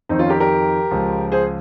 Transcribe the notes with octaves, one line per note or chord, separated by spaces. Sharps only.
F2 D#3 C4 D#4
C#4 F4
G4 A#4
G4 A#4
C#2 C#3 F3
G#4 C5